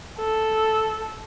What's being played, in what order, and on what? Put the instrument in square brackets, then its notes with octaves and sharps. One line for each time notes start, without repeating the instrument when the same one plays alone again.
[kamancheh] A4